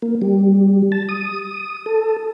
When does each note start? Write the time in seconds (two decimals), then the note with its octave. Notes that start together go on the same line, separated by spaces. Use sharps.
0.02 A#3
0.22 G3
0.92 A5
1.09 D#6
1.86 A4